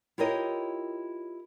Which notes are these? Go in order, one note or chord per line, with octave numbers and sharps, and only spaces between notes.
E4 F4 G4 A#4 C#5 D#5